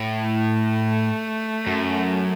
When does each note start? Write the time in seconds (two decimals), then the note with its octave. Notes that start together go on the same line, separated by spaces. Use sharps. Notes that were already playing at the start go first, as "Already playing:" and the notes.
Already playing: A2
0.25 A3
1.67 F#2